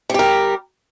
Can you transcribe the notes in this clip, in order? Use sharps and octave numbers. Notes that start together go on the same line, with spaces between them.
G3 G4 A#4